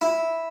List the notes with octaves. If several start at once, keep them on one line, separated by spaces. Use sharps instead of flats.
E4